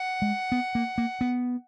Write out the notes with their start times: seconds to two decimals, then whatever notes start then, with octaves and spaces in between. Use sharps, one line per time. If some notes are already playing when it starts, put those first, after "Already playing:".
Already playing: F#5
0.22 G#3
0.52 B3
0.75 A#3
0.98 A#3
1.21 B3